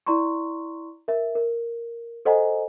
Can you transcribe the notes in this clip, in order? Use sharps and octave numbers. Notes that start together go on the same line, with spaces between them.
E4 D5 A#5 C6 C#6
A#4 E5
A#4
A4 C5 D#5 F#5 G#5 A#5